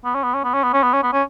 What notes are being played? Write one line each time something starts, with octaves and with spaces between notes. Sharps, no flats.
B3
C#4
B3
C#4
B3
C#4
B3
C#4
B3
C#4
B3
C#4